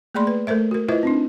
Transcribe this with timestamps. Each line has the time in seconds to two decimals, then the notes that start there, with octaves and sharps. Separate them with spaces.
0.14 A3 A#3 G#4 D5 B5 C6
0.27 B4
0.47 A3 A4 A#4 C5 E5
0.71 F#4 A#4
0.88 E4 F4 B4 C5 D#5 E5
1.03 C4 D4 D#4